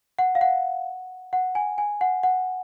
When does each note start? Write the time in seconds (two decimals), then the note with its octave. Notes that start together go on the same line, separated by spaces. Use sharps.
0.19 F#5
0.35 F5
0.41 F#5
1.33 F#5
1.55 G#5
1.78 G#5
2.01 F#5
2.23 F#5